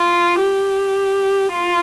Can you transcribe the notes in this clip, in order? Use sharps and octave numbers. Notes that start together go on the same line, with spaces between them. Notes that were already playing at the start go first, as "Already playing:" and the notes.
Already playing: F4
G4
F4